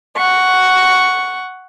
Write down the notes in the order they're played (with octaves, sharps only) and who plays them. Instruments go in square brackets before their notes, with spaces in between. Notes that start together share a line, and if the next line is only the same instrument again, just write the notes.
[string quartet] F#5 C#6